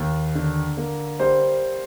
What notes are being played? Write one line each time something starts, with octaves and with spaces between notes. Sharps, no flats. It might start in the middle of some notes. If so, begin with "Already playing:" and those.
Already playing: D#2
D3
A#3
G3 C5